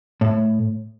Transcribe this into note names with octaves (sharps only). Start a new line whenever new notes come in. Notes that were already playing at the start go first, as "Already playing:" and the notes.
A2